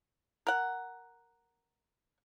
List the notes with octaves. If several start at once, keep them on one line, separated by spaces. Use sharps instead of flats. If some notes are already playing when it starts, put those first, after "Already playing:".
A#4 F#5